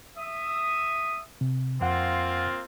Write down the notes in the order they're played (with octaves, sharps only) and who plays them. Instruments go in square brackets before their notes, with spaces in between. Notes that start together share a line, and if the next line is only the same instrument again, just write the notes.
[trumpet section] E5 D#6
[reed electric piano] C3
[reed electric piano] F2 F#5 [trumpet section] A#3 C4 F4